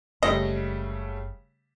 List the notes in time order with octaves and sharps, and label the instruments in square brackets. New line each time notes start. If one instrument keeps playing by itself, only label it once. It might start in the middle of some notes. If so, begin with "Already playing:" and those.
[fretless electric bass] F#1 [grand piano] C#3 G3 A3 [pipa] D#5